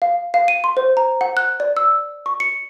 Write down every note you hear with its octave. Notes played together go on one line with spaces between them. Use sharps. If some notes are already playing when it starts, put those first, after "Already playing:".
F5
F5
D#7
C6
C5
A#5
F#5
F#6
D5
E6
C#6
C#7